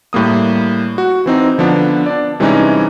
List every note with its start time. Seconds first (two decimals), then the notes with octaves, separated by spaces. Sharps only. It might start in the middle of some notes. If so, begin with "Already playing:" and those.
0.13 A2 G3 A#3 D#6
0.98 F#4
1.26 E3 C4 D#4
1.58 D3 F3 B3 D4
2.06 D4 D5
2.40 C3 E3 G3 G#3 C#4 D#4